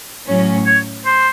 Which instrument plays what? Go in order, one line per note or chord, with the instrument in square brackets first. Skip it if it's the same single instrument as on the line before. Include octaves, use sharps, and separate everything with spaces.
[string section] A2 F#3 C#4
[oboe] C#5
C5